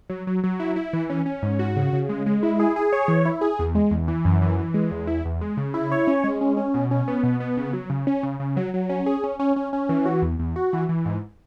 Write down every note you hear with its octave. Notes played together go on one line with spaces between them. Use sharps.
F#3
F#3
F#3
E4
E4
E3
C#4
C#4
G#2
F#4
C#3
C#3
G#3
G#3
E4
G#4
G#4
C#5
E3
E4
G#4
E2
G#3
E2
E3
F#2
E3
E3
G#3
E2
E4
E2
G#3
C#3
E4
C#5
C#4
G#3
C#4
C#4
B2
C#4
B3
B2
B3
C#3
F#3
C#3
C#4
C#3
C#3
F#3
F#3
C#4
G#4
C#4
C#4
C#4
C#4
E3
F#4
E2
E2
F#4
E3
E3
G#2